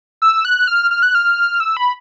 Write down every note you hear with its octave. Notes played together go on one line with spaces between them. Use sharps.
E6
F#6
F6
F6
F#6
F6
E6
B5